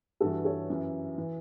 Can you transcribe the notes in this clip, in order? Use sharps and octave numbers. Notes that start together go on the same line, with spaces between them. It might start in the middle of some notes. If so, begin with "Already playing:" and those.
G2 E3 F#4 A4
A4 C#5
F#2 E3
E3